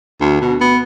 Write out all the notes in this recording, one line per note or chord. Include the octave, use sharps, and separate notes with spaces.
D2
B2
B3